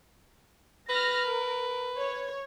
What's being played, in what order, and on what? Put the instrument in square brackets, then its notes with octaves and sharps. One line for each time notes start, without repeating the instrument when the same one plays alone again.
[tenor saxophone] B4 [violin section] F6 A#6
[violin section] A#4
C#5